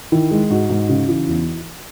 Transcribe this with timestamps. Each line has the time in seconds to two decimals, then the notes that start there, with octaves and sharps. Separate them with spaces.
0.12 D#3 E4
0.31 G#3
0.50 G#2 D#4 F#4
0.70 G#2
0.89 C#3
1.08 E3
1.28 E2